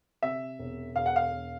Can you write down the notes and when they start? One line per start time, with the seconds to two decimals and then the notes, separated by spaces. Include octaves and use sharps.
0.22 C3 E5
0.59 E1
0.96 E1 F5
1.06 F#5
1.16 F5
1.33 E1